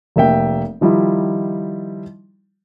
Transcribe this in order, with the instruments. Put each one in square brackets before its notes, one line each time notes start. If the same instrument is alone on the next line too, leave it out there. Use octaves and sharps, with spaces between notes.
[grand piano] F1 A#3 E5 G5
D#3 F3 G3 D#4 E4